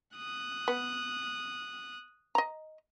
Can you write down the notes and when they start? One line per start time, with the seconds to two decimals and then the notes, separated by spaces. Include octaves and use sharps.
0.17 D#6 F#6
0.68 B3
2.35 D#5 A#5